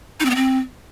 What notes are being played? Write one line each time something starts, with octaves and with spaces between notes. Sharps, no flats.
D#4
C4
B3
C4